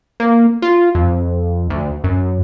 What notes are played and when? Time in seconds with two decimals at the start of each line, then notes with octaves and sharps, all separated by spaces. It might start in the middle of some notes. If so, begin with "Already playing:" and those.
0.20 A#3
0.62 F4
0.95 F2
1.70 D2
2.04 F#2